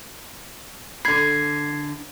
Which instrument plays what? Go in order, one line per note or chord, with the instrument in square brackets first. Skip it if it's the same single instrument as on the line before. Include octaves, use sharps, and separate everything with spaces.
[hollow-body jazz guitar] D3 B5 [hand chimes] G#6 C7